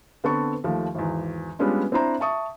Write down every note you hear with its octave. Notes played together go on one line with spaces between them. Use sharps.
D3 B3 C4 A4 A5 C#6
D#2 F3 A3
G#1 E2
G3 G#3 B3 C#4 D4 F4
C4 D4 E4 C5 A#5
E5 A5 C#6 D#6